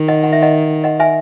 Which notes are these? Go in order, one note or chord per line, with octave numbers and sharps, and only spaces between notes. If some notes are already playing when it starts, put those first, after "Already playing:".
Already playing: D#3
D#5 F#5
F#5
E5
D#5 F#5
D#5 F#5
E5 G#5